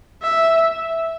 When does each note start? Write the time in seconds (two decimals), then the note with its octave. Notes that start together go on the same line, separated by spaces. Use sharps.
0.22 E5